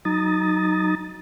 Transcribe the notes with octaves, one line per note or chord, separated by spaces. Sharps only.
F#3 D#4 A#5 D#6 A6